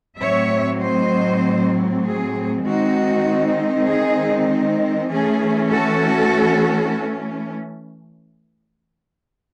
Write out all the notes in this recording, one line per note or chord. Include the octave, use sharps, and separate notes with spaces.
A2 F#3 C4 C#5 E5
C5 D#5
G#4
D#3 G#3 C4 D#4 F#4
G#4
E3 A3 C#4 G#4
F#4 A4